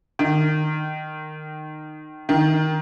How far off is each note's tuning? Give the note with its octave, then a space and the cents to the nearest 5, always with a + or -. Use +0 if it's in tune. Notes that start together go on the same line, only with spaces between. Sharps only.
D#3 -20
D#3 +5